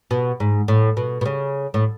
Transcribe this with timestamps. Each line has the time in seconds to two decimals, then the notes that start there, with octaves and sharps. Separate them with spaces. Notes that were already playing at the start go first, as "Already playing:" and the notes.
0.11 B2
0.40 G#2
0.68 A2
0.97 B2
1.21 B2
1.25 C#3
1.74 A2